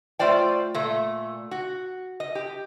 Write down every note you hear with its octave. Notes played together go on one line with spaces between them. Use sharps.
A3 F4 C5 D5 G5
A#2 A3
F#4
D#5
G4